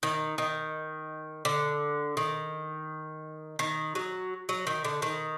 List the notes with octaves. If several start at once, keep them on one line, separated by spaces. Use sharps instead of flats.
D#3
D#3
D3
D#3
D#3
F#3
F#3
D#3
D3
D#3